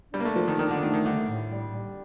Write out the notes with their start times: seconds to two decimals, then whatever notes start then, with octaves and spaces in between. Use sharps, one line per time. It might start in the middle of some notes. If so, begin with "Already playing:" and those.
0.13 G3 D4
0.20 A#3
0.25 A3
0.36 F3 F4
0.48 D#3
0.59 D#3 D4
0.71 D3
0.82 D#3 A3
0.94 D#3
1.06 D3 G3
1.28 A2
1.51 G3
1.74 G3